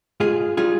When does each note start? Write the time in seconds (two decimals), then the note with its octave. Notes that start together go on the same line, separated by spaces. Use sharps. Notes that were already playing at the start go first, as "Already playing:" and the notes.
0.20 G#2 F4 G#4
0.57 G3 F4 G#4